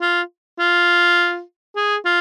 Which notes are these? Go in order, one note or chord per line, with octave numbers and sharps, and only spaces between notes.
F4
F4
G#4
F4